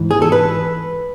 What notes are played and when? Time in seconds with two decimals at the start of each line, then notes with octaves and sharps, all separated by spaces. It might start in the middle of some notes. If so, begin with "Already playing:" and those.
Already playing: G#2 E3
0.11 G#4
0.22 A4
0.32 B4